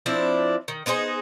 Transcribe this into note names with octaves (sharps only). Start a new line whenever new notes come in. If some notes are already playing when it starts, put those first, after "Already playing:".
F3 C4 D4 E4
D#3
B3 D#4 G#4 C5